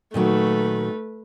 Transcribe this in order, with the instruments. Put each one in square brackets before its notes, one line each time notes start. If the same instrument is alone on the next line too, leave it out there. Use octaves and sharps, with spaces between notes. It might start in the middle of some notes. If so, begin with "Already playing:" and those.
[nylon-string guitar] A#2 D#3 F#3 [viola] A3 B4